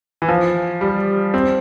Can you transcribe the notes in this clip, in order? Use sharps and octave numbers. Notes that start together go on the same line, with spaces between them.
E3
F3
G3
C4